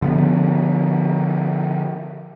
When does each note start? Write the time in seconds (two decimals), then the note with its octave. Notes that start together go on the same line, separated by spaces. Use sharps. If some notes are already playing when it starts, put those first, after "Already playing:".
0.02 D3 F3 B3